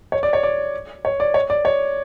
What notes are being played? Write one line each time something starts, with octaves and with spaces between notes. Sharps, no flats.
C#5
D5
C#5
D5
C#5
D5
C#5
D5
C#5